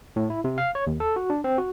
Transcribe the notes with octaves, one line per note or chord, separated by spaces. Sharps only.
A2
E4
C3
F5
C#5
D#2
A4
F#4
D4
C4
F#4